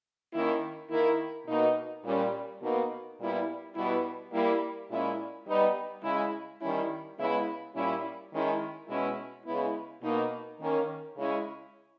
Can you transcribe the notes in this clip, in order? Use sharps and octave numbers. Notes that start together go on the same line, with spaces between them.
D#3 A#3 C#4 E4
D#3 A#3 E4
B2 A#3 D#4
A#2 G3 C#4
B2 A#3 D#4
A#2 G3 B3 E4
B2 G3 B3 E4
G3 A#3 E4
A#2 G#3 C#4 E4
G3 B3 D#4
C#3 G#3 C#4 E4
D#3 G3 C#4 E4
C#3 G#3 B3 E4
A#2 G3 C#4 E4
D#3 G#3 C#4 E4
B2 G#3 C#4 E4
C#3 G#3 B3 E4
B2 A#3 D#4
D#3 A#3 C#4
C#3 G#3 C#4 E4